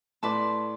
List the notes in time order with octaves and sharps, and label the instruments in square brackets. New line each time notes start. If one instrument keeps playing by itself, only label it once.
[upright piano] A2 [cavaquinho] B4 D5 A5 C6